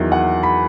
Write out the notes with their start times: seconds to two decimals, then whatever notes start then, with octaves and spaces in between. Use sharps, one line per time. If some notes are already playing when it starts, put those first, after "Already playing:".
Already playing: E2 D#3 F#3 E5
0.12 F#5
0.43 B5